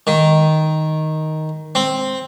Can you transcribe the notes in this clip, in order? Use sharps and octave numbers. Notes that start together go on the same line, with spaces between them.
D#3
C4